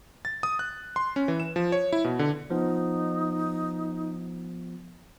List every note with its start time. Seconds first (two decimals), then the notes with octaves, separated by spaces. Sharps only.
0.25 A6
0.43 D#6
0.59 F#6
0.96 C6
1.16 C#4
1.28 E3
1.40 E7
1.56 F3
1.72 C#5
1.93 E4
2.04 B2
2.19 D3
2.50 F3 B3 D#4